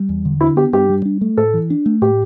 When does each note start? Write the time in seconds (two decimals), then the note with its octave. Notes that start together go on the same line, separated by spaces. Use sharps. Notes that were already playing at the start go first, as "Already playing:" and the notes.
Already playing: G3
0.09 E2
0.25 D3
0.41 D4 E4
0.56 B3 G4
0.73 G2 G4
0.90 G3
1.05 D4
1.21 A3
1.37 A2 A4
1.54 E3
1.70 D4
1.86 A3
2.02 A2 G4